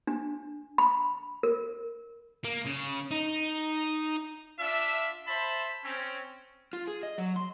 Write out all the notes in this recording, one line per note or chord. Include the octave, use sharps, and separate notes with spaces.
D4
B5
A#4
A#3
C#3
D#4
D4 F4 E5
C5 E5 A5 B5
C4 C#4
F4
G#4
D#5
F#3
C6